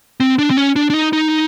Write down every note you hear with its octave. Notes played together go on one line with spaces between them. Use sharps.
C4
D4
C4
C#4
D4
D4
D#4
D#4